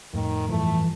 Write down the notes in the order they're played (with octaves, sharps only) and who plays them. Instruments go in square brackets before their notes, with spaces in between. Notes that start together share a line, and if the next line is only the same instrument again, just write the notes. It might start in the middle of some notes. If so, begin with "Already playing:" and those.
[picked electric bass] F2 A2 [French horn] D#3
[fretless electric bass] G2 F3 [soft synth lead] E3 [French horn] A3